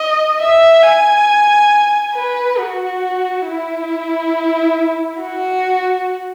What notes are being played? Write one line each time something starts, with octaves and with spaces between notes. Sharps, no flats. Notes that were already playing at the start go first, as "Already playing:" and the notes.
Already playing: D#5
E5
G#5
B4
F#4
E4
F#4